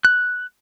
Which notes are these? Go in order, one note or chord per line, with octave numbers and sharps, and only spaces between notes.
F#6